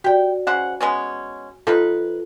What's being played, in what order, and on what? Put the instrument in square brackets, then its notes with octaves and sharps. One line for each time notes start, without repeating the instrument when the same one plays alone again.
[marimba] F#4 D5 [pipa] G4 G5
[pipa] C#3 C5 F#5
G#3 B3 C#4
[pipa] F3 D#4 B4 [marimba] F4 A4